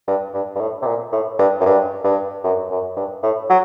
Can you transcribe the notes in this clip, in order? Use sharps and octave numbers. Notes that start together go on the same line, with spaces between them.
G2
G2
G2
A2
C3
A#2
A2
G2
F#2
G2
G2
F#2
F#2
G2
A2
F#3